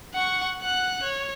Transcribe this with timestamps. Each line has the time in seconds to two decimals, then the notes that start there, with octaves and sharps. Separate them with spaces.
0.14 F#5 C#6
0.62 F#5 F#6
1.03 C#5